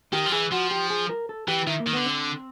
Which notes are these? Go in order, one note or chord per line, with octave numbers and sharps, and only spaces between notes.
D#3 G4
F3
E3 G#4
F3 F#4
G4
G#4
A#4
A4
E3 G4
D#3 E4
A#3
D#3
D3 B3
C4